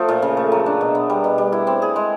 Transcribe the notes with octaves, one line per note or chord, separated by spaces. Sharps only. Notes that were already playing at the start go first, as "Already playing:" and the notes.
Already playing: F3 A3
A#2
C#3
A3
F#3
D4
B2
B3
G3
B2
G3
E4
C4
G#4
G#3